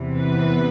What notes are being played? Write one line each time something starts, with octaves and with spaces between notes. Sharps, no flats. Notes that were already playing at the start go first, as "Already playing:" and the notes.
Already playing: E2 C3 E3
B3 B4